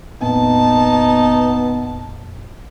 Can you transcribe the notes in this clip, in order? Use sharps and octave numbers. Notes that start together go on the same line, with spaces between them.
F1 A#2 B3 C4 D#4 A5